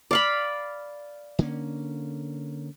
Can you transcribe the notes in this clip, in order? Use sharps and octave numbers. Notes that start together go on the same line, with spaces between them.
D5 F5 B5
D3 A#3 C#4